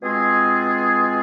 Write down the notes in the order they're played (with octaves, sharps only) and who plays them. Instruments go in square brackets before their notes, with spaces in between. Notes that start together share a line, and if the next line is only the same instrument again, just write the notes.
[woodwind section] B2 G#3 C4 F4 G#4